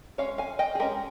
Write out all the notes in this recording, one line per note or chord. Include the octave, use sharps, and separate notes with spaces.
G#3 C#4 C#5 F5
F5 G#5
D#5 G5
G#4
G#3 C#4 G4 A#4